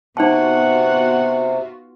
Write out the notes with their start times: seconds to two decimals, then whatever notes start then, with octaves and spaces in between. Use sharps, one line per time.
0.17 C3 B3 D#4 F4 F#4 F#5 A5